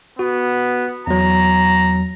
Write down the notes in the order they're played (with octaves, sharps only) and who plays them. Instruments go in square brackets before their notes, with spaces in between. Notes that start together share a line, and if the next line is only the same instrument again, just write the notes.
[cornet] B3 [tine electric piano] F#4
[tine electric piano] E2 F#3 [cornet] A#5